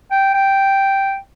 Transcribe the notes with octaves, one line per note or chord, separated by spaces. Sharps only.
G5
G5